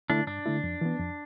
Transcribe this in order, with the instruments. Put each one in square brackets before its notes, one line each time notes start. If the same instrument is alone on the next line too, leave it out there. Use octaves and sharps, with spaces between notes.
[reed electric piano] D3 A3 E4 [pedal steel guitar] D4
[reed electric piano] G2 [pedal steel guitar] D4
[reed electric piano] D3 A3 E4
F2
E3 B3
F2